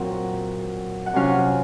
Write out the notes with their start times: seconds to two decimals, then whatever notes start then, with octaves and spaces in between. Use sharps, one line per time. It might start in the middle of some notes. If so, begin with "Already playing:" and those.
Already playing: A#2 F#3 C4 F4 F#5
1.06 F#5
1.13 C3 F#3 C#4 F4 F5